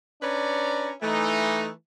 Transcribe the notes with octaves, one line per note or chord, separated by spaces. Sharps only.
C#4 D4 B4 C#5 D5 A#5
E3 A3 D#4